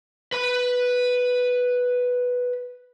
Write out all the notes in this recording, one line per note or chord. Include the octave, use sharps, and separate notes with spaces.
B4 B5